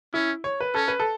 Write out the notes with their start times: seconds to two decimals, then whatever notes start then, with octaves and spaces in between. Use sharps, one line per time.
0.14 C#4 E4
0.44 C#5
0.60 B4
0.75 C#4 A4
0.88 B4
1.00 A4